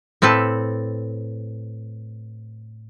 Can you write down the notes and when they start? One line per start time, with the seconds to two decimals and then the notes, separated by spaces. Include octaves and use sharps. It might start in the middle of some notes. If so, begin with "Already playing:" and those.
0.22 A2 C4 A4 B4 A5